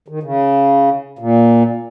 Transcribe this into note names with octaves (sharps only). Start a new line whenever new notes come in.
D#3
C#3
A#2